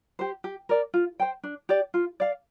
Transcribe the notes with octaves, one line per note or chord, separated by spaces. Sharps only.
G4 C5
G4
A#4 D5
F4
C5 G5
D4
G4 D5
F4
D5 F5